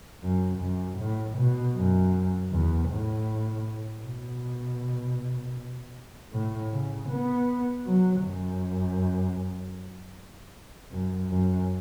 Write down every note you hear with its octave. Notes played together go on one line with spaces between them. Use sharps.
F#2
F#2
A2
B2
F#2
E2
A2
B2
A2
C#3
B3
F#3
F#2
F#2
F#2